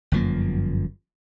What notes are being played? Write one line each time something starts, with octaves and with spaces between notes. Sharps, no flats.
G1 F#2 F3 A#3